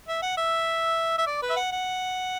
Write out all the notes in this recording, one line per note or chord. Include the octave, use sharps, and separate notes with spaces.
E5
F#5
E5
E5
D5
B4
E5
F#5
F#5